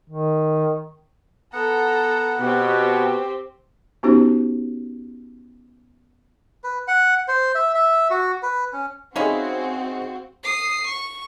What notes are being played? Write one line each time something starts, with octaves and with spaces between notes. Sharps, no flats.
D#3
B3 A4 F#5 A#5
B2 C4 G4
B3 C#4 D#4 F#4 G4 C5
B4
F#5
C5
E5
E5
F#4
B4
C#4
G#3 C4 C#4 D#4 E4 F#4 G#4 F5
D#6 C7
C#6